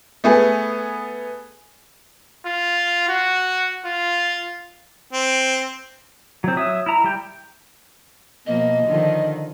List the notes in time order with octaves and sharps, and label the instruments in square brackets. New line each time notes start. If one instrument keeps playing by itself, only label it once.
[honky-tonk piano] A3 B3 G#4
[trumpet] F4
F#4
F4
[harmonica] C4
[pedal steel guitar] F#3 C4
F#3 E5 D#6
E4 A#5
G3 G5
[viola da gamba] B2 F3 A#3 [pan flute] D#5
[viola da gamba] D3 D#3 F3